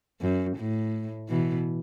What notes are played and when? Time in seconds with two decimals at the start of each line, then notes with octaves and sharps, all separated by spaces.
0.21 F#2
0.57 A2
1.29 B2 E3